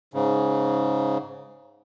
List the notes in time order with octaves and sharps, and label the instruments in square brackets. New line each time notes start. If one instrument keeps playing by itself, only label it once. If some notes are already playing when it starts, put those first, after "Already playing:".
[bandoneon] G#2 C#3